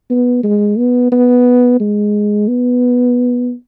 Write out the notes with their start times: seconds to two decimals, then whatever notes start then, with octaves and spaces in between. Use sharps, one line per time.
0.10 B3
0.43 G#3
0.78 B3
1.12 B3
1.80 G#3
2.48 B3